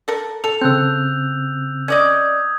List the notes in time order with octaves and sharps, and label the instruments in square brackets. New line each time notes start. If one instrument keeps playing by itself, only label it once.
[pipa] A4 A#4
[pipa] A4 [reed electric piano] A5 [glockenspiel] F7
[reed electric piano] C#3 C4 [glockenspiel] E6 F#6 G6
[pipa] C#4 D5 D#5 [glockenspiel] D#6 G6 G#6